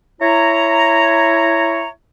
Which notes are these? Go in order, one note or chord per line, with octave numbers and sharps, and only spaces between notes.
E4 C#5 A#5